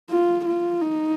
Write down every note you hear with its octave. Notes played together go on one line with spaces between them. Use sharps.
F4
F4
D#4